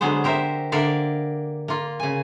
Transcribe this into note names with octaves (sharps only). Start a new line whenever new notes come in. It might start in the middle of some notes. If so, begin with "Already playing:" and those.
D3 F#3 G#3 B3 C5
G4 A#4 C5 E5
D3 A#3 A#4 D5 E5 F5
A#3 F4
C#3 G#5